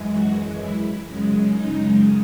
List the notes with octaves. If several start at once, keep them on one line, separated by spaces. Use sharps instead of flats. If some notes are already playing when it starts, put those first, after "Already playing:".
Already playing: F#2 E3 G#3
F#4
E4
F#2 C#3 G#3
D#4